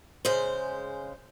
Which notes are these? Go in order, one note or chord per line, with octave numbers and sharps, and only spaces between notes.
C#3 G#3 C5